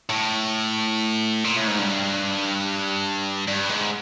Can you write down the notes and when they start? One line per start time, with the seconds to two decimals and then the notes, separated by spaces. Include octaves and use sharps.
0.10 A2
1.44 A#2
1.57 A2
1.68 G#2
1.79 G2
3.48 G2
3.69 G#2